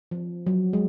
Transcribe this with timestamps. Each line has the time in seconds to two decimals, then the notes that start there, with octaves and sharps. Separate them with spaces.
0.11 F3
0.46 F#3
0.73 G#3